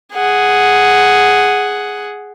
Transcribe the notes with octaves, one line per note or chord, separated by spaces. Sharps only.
G#4 F#5